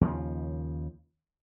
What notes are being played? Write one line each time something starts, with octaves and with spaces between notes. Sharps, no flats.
D#2 C#3 F3